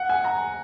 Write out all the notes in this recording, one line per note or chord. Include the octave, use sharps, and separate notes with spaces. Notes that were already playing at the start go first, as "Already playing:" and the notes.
Already playing: F#5
G#5
A#5